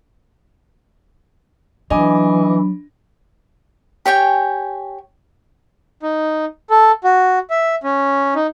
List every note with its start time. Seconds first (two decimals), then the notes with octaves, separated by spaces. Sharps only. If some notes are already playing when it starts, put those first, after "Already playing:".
1.90 E3 F#3 D4 D#5 G#5 B5 D6
4.06 G4 C#5 G5 G#5
6.03 D#4
6.70 A4
7.04 F#4
7.50 E5
7.83 C#4
8.35 D#4